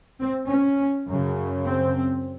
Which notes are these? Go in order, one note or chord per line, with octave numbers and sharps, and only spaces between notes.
C4
C#4
F#2 C#3
C4